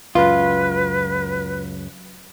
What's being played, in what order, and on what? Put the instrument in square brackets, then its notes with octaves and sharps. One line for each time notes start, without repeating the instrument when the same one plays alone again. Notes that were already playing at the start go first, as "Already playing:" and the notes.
[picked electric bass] C#2 F#2 [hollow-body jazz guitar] F4 [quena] B4